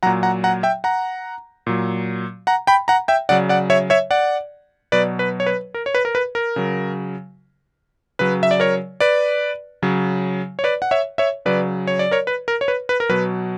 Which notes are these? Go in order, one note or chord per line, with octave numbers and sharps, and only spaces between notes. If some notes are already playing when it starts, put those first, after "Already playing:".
A#2 F#3 F#5 A#5
F#5 A#5
F#5 A#5
E5 G5
F#5 A#5
A#2 F#3
F#5 A#5
G5 B5
F#5 A#5
E5 G5
C#3 F#3 D5 F#5
D5 F#5
C#5 E5
C#5 E5
D5 F#5
B2 F#3 B4 D5
B4
C#5
B4
A#4
C#5
B4
A#4
B4
A#4
C#3 F#3
C#3 F#3 B4
E5
D5
A#4 C#5
B4 D5
C#3 F#3
C#5
B4 D5
F#5
C#5 E5
C#5 E5
C#3 F#3 B4 D5
C#5
D5
A#4 C#5
B4
A#4
C#5
B4
B4
A#4
B2 F#3 B4